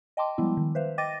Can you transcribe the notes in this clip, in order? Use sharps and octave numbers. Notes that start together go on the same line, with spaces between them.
D#5 G5 A5 C6 D6
F3 G3 G#3 B3 E4
D#3
B4 C5 E5 F5
D#5 G5 D6 A6 A#6 D#7